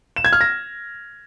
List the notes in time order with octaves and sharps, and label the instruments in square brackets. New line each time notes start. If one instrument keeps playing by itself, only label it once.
[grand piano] E7
G#6
F6
A#6